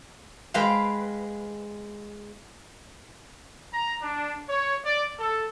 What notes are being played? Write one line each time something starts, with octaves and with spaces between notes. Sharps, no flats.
G#3 B4 F5 G5
A#5
D4
C#5
D5
A4